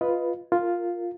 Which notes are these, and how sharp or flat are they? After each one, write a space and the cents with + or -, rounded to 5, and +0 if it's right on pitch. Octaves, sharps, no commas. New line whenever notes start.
F4 +0 B4 +0 D#5 +15
F4 +0 A#4 -10